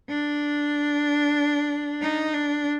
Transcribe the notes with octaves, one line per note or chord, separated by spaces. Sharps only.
D4
D#4
D4